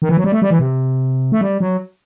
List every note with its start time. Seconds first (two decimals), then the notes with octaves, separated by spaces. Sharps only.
0.02 D#3
0.09 E3
0.17 F#3
0.24 G3
0.32 A3
0.42 G3
0.50 E3
0.59 C3
1.32 A3
1.41 G3
1.60 F#3